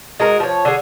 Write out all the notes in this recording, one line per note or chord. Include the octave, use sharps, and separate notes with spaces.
G#3 F#4 A#4
F3 C#5
D3 G#4